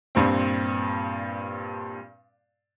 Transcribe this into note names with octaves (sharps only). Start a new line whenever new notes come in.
G2 A#2 C4